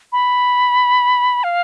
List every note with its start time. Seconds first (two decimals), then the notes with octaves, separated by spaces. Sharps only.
0.12 B5
1.44 F5